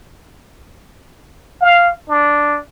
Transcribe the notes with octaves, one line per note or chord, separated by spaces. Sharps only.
F5
D4